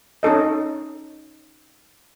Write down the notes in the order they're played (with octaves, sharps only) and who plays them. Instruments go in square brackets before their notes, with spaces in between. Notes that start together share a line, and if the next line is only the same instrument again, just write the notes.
[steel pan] C#4 D#4 A4 D#5